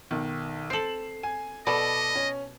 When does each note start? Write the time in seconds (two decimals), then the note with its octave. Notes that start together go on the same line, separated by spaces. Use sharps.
0.11 B1 D#3
0.70 C4 A4 C7 E7 F#7
1.23 G#5
1.67 B2 A4 D5 D#5 B5
2.15 C#4